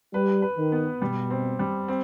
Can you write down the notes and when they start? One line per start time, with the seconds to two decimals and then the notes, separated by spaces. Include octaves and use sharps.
0.13 G3 B4
0.42 B4
0.58 D#3
0.72 B3
1.01 B2 G3
1.30 C4
1.59 G3
1.88 C4